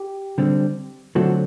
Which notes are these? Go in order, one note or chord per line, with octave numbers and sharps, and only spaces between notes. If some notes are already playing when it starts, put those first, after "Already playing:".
Already playing: G4
D3 G3 C4
D3 F#3 A3 C4 F#4 A4